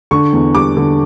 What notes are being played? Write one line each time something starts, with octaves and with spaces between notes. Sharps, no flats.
D3 C#6
E2
G3 D6
D3